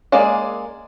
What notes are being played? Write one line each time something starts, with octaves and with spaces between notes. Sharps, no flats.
G#3 A#3 G#4 D5